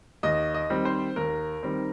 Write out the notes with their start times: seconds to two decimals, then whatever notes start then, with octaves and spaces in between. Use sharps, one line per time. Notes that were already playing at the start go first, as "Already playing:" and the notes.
0.23 D#2 D#5
0.54 D#5
0.70 D#3 G3 C4
0.85 C5
1.16 D#2 A#4
1.63 D#3 G3 C4